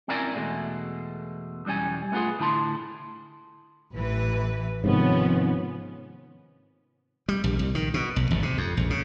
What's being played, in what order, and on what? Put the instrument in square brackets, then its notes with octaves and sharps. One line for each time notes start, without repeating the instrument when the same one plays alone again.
[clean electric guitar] C4 C#4 E4 A#4 D5 G#5
E2 B2 G#3 A3
B1 E2 G3 C#4 G#5
A3 B3 D#4 F4 G#4
A2 D3 E4 A5 C6
[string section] A1 E3 B4
[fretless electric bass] G#2 C3 D#3 [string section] F3 B3 C#4
[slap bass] G3
A#1
C2
D#3
B2
B1
G#1
C3
F2
A#1
C#3